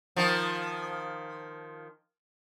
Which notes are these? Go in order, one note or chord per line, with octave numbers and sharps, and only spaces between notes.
D#3 F3